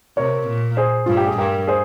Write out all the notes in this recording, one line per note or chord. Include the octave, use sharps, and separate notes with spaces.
C3 A#4 C#5
A#2
G#4 C5
G2 F4
G4
G#4
G2 G4 A#4
G#4 C5